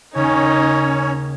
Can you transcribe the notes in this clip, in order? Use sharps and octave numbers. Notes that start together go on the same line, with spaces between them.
D#2 C#3 C#4 D#4 C#5